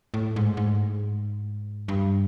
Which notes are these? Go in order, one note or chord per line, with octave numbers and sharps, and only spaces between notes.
A2
G#2
G#2
G2